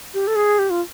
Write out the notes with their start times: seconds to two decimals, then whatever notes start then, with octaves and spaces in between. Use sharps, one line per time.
0.14 G4
0.27 A4
0.36 G#4
0.59 G4
0.70 F4